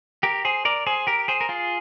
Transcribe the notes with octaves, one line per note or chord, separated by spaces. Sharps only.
G4 A#4
G#4 C5
A#4 D5
G#4 C5
G4 A#4
G#4 C5
A#4
F4 G#4